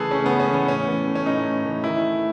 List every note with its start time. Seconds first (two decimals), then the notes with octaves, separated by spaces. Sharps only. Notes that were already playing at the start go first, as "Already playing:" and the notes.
Already playing: C#3 E3 A3 G#4 A4 B4
0.11 C#3 C#4
0.26 C#3 B3
0.40 C#4
0.49 E3
0.54 B3
0.68 A2 C#4
0.88 E3
1.07 A3
1.15 C#4
1.26 A2 D#4
1.45 A2
1.65 E3
1.84 D#3 E4
2.03 A3